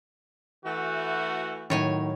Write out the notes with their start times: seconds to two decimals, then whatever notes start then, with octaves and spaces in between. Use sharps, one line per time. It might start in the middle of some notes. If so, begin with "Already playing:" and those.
0.65 E3 A3 F#4
1.70 A2 D#3 F#3 C#5 G#5